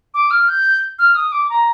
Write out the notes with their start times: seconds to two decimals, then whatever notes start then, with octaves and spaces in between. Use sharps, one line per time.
0.14 D6
0.31 F6
0.48 G6
0.99 F6
1.15 D#6
1.32 D6
1.50 A#5